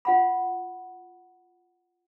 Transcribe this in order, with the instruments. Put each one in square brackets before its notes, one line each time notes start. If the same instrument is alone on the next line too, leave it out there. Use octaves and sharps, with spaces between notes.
[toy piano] F4 F#5 B5